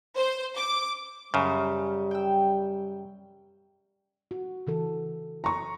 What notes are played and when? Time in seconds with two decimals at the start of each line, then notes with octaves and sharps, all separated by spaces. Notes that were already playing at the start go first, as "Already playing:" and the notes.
0.17 C5
0.56 D6
1.34 F#2 C#3 G3
2.11 G5 E6
4.31 F#4
4.67 C#3 E3 A4
5.44 A#5 C#6